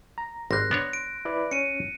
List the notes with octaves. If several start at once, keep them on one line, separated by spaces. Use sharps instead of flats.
A#5
G#1 G3 C6 F#6 A#6
B3 D4 C#5
D7
E4 B4 D5
C#4 C#7 D#7